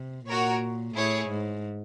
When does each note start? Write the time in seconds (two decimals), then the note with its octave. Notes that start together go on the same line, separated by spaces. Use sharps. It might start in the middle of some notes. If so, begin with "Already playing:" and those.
Already playing: C3
0.26 A#2 F#4 A#4 C#5
0.95 A2 E4 G#4 C#5
1.29 G#2